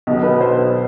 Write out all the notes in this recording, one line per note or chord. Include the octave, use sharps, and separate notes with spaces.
B1 B2
B4
C5